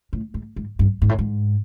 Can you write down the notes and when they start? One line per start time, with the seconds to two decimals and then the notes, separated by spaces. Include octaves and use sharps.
0.13 A2
0.34 G#2
0.56 G#2
0.79 G2
1.02 G#2
1.09 A2
1.19 G#2